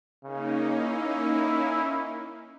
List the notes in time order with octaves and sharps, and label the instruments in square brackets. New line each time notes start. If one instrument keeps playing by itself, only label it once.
[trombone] C#3 [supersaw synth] A#3 C#4 D#4
[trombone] E4